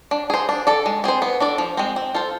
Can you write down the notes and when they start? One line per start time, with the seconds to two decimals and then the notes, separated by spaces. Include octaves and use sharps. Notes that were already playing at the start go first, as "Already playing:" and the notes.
0.11 D4
0.30 G#4 C5
0.49 D4
0.67 A4 D5
0.86 G#3
1.04 C4 G#4 C5
1.22 B3
1.40 D4 A4 D5
1.58 F3
1.77 G#3 C4
1.96 C4
2.14 F4 A4 C5